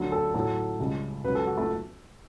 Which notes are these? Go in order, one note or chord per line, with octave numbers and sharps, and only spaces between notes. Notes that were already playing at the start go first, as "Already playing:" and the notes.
Already playing: D2 D3 F#3
A4
A2 F#3 A4
C#2 C#3 G3
C#2 C#3 F#3 B4
A4
F#4
A3